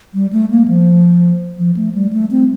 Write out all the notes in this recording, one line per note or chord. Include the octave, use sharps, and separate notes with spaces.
G3
A3
A#3
F3
F3
A3
G3
A3
C4